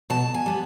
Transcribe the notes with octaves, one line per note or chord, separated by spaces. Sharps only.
B2 A5
G#5
G3 B3